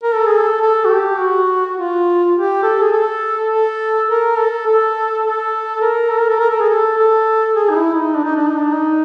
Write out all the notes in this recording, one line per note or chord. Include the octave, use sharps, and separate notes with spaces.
A#4
A4
G#4
A4
A4
F#4
G4
F#4
F4
G4
A4
G#4
A4
A4
A#4
A4
A4
A4
A#4
A4
A#4
A4
A#4
A4
G#4
A4
A4
G#4
D#4
E4
D#4
D4
D#4
D4
D#4
D4
D#4